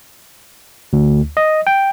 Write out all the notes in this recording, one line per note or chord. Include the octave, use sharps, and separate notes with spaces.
D2
D#5
G5